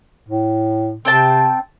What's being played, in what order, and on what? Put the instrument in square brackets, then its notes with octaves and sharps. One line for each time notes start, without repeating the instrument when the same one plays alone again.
[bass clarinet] A2
[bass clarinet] C3 [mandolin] C4 G5 A5